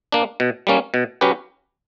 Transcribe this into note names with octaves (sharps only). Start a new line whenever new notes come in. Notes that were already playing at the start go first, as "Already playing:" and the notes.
A#3 D4
B2
G3 A#3 C#4
B2
F#3 C#4 G4 B4